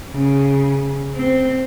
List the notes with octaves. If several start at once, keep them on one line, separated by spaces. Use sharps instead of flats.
C#3
C4